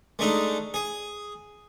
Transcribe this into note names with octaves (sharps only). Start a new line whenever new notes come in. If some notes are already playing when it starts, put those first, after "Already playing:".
G#3 A3 D4 D#4
G#4